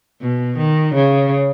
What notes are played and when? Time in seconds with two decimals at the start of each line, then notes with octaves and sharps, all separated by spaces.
0.21 B2
0.57 D#3
0.95 C#3